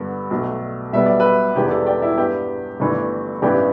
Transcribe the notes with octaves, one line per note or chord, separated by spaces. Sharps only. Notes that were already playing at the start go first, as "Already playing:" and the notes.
Already playing: G2 D3 B3 A4 D5
B1 B2 A3
B1 B2 G3 B3 E5
D5
B4 E5
E1 E2 E3 B3 G4
A4 D5
D5 G5
E4
G2 G3 B3 G4
G1 G2 E3 A3
A1 G2 E3 G3 B3 G4